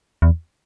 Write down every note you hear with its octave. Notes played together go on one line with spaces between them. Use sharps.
E2